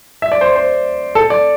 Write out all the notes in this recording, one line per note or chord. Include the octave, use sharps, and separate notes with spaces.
E5
D5
C5
C5
A4
D5